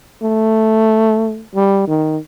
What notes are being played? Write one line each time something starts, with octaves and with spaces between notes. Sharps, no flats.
A3
G3
D#3